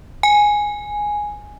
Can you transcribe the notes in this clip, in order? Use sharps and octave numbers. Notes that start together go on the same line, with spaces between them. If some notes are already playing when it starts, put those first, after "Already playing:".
G#5